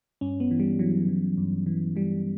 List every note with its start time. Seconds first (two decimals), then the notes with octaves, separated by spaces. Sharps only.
0.21 G2 C#4
0.40 B3
0.51 E3
0.60 G3
0.79 E3 F#3
1.09 E3
1.38 G2
1.66 E3
1.95 E3 G3